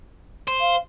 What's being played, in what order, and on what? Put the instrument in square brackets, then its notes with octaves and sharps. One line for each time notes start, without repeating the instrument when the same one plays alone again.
[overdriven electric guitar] C5
[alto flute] F5